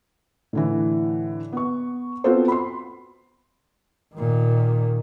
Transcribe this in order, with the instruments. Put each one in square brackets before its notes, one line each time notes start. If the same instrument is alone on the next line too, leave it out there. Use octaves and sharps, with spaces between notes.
[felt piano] A2 D3 E3
B3 C#6
B3 C4 F4 F#4 A4 C5
B5 C6
[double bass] A#2 D#3